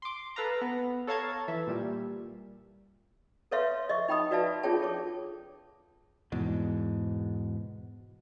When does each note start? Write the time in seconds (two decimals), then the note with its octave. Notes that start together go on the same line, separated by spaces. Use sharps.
0.02 C6 D6
0.36 A4 B4 F5 A#5
0.61 B3
1.07 A4 C#5 F5 A5 A#5 G#6
1.48 E3 A4 E5
1.67 A#2 G3
3.51 A4 B4 C#5 E5 F5 C6
3.89 D#5 E5 C#6
4.08 D#4 G5 B5 D#6
4.31 F#4 B4 D5 E5 F5 A5
4.63 D4 F4 G#4 C#5 G5 A5
4.81 A4 C#5 D6
6.32 E2 G#2 B2